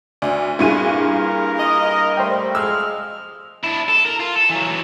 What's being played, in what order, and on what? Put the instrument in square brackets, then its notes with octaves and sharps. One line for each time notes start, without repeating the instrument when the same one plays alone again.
[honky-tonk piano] D2 [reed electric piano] D5
[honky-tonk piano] G2 A#2 D#7 [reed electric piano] E4 G#4 [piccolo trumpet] F#4
[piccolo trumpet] A#4
[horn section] D#5
[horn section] G3 A3 [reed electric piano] C5 G5
[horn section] F3 G#3 [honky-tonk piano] E6 [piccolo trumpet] F6
[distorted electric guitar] D4 E4
A4
A#4
F4
A4
E3 F#3